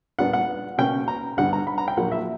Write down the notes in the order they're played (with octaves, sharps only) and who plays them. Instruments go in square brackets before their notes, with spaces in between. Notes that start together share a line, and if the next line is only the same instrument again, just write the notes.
[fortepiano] A#2 G3 B3 D4 F#5
F#5
B2 A#3 C#4 G5
A#5
G2 D3 G3 B3 F#5
A#5
B5
A#5
G5
A#1 A#2 F#3 A#3 F#5
E5